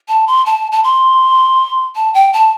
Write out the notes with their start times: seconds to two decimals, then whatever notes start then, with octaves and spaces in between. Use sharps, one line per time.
0.08 A5
0.27 C6
0.46 A5
0.72 A5
0.84 C6
1.96 A5
2.14 G5
2.33 A5